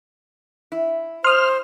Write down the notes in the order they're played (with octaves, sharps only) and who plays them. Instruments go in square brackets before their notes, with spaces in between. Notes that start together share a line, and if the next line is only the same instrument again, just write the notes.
[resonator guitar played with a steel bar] E4
[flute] C5 [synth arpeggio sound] C6 D#6 [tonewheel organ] F6